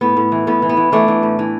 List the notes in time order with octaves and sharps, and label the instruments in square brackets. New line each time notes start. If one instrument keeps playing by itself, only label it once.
[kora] A2 B3
A2
E3
A2 B3
E3
B3
E3
E3 A3 D4
E3
A2
E3